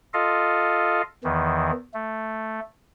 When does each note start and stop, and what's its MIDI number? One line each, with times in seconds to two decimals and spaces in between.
0.14 1.02 65
0.14 1.02 69
0.14 1.02 75
0.14 1.02 77
1.24 1.71 40
1.24 1.71 51
1.24 1.71 52
1.94 2.60 57